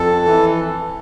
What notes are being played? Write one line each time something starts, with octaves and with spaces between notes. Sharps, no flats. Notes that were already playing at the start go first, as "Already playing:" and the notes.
Already playing: F2 A4
E3